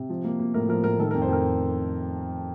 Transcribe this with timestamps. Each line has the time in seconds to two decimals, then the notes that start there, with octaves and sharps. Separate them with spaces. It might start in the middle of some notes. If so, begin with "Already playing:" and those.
Already playing: C3
0.09 F3
0.24 A#3
0.40 A#3
0.54 A2 A#4
0.68 F3 A#4
0.83 A2 A#4
0.99 D#3 A4
1.11 F2 A#4
1.22 C5
1.28 F2 A#4